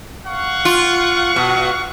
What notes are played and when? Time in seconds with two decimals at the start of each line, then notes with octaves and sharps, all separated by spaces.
0.27 F5 F#5 C#6
0.65 F4
1.36 B2